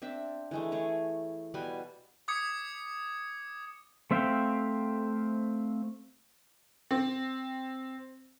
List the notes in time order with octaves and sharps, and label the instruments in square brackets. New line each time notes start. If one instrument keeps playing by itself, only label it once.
[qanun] C4 D4 E5
E3 G#3 A3
A3 G#4 C#5
B2 G3 B3 G#5
[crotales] D6 D#6 G#6 C#7
[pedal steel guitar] A3 C4 E5 F5 G5
[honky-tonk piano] C4